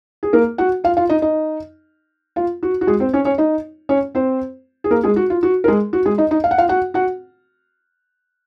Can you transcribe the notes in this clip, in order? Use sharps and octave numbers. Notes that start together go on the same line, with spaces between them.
G#4
A#3 A#4
F#4 F#5
F4 F5
F4 F5
D#4 D#5
D#4 D#5
F4 F5
F#4
F#4
G#3 G#4
C4 C5
C#4 C#5
C#4 C#5
D#4 D#5
C#4 C#5
C4 C5
G#4
A#3 A#4
G#3 G#4
F#4
F4
F#4
A#4
G#3 G#4
F#4
G#3 G#4
D#4 D#5
D#4 D#5
F5
F#5
F4 F5
F#4 F#5
F#4 F#5